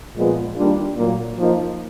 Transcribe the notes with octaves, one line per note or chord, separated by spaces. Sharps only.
A#2 F3 G#3 B3
D#3 G3 A#3 D4 F4
A#2 F#3 A#3
F3 A#3 D#4